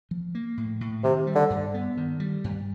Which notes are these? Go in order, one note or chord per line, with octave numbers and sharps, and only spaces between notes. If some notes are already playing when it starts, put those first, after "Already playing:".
F3
A#3
A2
A2
C3 D#3
G3
D3
G2
B3
D#3
G3
G2